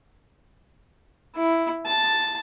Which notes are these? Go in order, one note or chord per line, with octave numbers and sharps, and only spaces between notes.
E4
A5